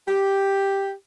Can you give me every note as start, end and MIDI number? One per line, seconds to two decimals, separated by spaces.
0.08 0.92 67